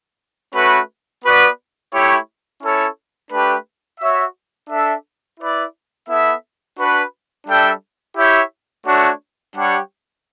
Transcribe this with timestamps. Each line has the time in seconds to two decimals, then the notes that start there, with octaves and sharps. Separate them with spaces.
0.54 A3 C#4 F#4 B4
1.24 B3 F#4 B4 D5
1.93 A3 E4 G4 C#5
2.62 C#4 E4 A4 C#5
3.31 A3 D4 G4 B4
4.00 F#4 C#5 E5
4.70 D4 A4 E5
5.40 E4 B4 D5
6.08 B3 E4 A4 E5
6.78 D4 F#4 B4
7.47 G3 D4 A4 E5 G5
8.17 E4 G4 C#5 E5 G5
8.86 A3 D4 F#4 C#5
9.55 G3 D4 G4 C#5 F#5